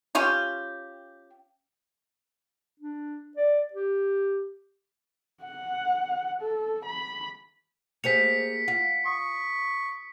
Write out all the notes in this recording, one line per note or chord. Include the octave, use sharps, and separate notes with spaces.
C#4 F4 G4
D4
D5
G4
F#5
A4
B5
A#3 G4 G#4 C5 B6 C#7 F7
F4 F#5
C#6 D#6